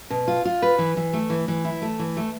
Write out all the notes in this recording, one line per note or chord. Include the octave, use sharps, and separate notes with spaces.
B2
F4
F4
B4
E3
E3
A3
E3
E3
E4
A3
E3
A3